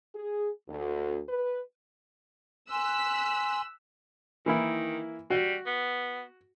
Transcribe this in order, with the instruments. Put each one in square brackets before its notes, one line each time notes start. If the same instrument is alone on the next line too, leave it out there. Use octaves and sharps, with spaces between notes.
[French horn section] G#4
D2
B4
[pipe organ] G#5 C6 [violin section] E6 F#6 B6
[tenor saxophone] D#3 [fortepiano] E3 A#3 E4
[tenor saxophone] G3 [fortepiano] F#4
[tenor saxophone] B3